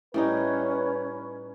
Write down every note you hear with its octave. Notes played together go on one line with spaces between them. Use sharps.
A2 G3 C#4 D#4 B4